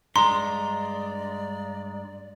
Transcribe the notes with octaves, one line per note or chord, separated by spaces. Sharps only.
G2 G#3 D5 A#5 C6